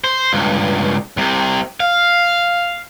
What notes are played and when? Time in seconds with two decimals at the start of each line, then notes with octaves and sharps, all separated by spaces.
0.04 C5
0.33 C#2 G2
1.17 C2 C3
1.80 F5